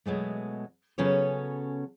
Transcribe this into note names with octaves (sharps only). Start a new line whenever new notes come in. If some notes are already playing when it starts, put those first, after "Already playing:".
B2 F#3 G#3 A3
C#3 F#3 B3 C#4 A4 C#5